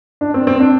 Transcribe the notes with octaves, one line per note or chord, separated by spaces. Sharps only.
D4
C4
C4
D4